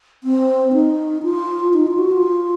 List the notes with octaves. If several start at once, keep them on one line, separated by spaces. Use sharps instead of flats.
C4
D#4
F4
D#4
F4
F#4
F4